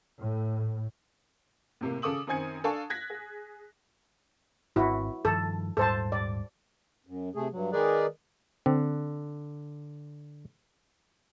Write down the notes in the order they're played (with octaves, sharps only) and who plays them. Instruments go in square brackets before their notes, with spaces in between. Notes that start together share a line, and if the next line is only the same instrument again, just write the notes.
[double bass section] A2
[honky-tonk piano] A2 C3 A#3
C#3 A4 D6 D#6 F#7
F#2 D#3 C4 G#5 G#6 C#7
D4 A4 F5 G#5 A5 C#6
F#6 G#6 A#6 B6
G#4
[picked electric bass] G#1 C4 [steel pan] E4 F#4
[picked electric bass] G2 D#3 F3 [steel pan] A4
[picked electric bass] D#1 G#2 G3 [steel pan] A4 C5 A5
[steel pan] D5
[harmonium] F#2
C3 A3 G#4
G2 F#3
D#3 G#3 G#4 A#4 B4 D5
[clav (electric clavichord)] D3 [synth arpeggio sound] C4